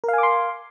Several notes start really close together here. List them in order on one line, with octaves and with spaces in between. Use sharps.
A#4 F5 G#5 D6 C6